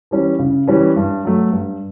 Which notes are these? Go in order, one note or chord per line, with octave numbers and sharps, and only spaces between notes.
E3 G3 C#4
C#3
E3 G3 C#4
G2
F#3 A3
G2